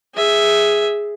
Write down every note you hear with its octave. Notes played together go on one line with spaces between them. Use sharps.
G#4 E5